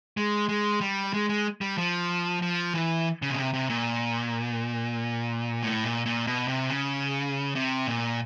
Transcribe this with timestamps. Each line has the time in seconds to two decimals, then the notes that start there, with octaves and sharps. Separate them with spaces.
0.17 G#3
0.49 G#3
0.81 G3
1.13 G#3
1.29 G#3
1.61 G3
1.78 F3
2.42 F3
2.74 E3
3.22 C#3
3.30 B2
3.39 C3
3.53 C3
3.70 A#2
5.63 A2
5.84 A#2
6.06 A#2
6.27 B2
6.48 C3
6.70 C#3
7.55 C3
7.88 A#2